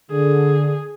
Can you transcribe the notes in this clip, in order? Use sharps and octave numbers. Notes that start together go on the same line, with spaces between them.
D3 G#4